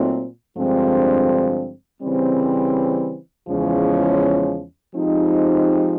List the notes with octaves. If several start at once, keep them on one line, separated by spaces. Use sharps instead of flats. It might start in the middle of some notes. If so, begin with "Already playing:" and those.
Already playing: A#2 F#3 A3 C4 D#4
G2 D3 F3 G#3 C4
C#3 E3 G3 C4
E2 C#3 F3 G#3 C#4
F3 G#3 C4 D#4 G4